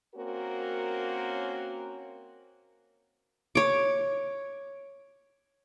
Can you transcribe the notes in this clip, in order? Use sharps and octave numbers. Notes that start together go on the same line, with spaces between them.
A#3 C4 C#4 F#4 A#4
C#5 D6